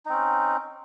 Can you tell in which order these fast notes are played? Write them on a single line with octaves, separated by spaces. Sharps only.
D#4 C4 C#4